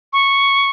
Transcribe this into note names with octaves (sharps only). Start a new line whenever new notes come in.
C#6